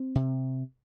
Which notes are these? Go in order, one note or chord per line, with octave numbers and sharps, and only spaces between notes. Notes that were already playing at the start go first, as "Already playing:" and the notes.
Already playing: C4
C3